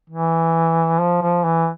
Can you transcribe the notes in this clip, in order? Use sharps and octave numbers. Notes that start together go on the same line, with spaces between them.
E3
F3
F3
E3